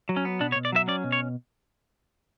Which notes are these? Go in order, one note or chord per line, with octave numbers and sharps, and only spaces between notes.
F#3
C#4
B3
B2 D4
C#5
B2
D5
F#3 E5
C#4 D5
B2
C#5